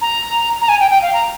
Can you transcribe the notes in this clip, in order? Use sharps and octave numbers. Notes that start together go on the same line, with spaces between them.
A#5
A#5
G#5
G5
G5
F5
A#5